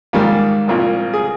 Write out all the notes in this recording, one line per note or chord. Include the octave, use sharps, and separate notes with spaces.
G#2 D#3 G3 A#3 F4
C2 A#2 F3
G#4